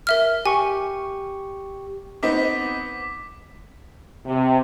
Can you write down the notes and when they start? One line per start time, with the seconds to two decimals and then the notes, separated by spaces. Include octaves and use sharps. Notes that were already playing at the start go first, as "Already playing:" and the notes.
0.07 A#4 E5 F6
0.46 G4 G#5 C#6
2.23 B3 C4 D#4 D6 B6
4.26 C3